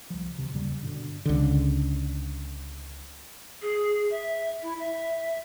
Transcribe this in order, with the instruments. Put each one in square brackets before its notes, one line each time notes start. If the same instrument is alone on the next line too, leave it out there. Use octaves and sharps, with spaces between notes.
[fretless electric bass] C2 F3
D1 C3 E3
D#2 G#2 C#3 G3
G2 B2 D3
C#2 D3
[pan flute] G#4
E5
E4
E5